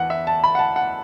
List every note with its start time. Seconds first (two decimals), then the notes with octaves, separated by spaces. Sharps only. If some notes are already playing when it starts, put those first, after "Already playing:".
Already playing: E2 E3 B3 F#5
0.10 E5
0.27 A5
0.44 B5
0.55 F#5
0.59 A5
0.76 F#5